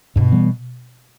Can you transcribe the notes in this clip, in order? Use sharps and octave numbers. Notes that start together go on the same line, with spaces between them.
G2 B2
E3 G3 B3